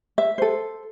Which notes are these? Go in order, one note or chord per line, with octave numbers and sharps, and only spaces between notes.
E5
A4 C5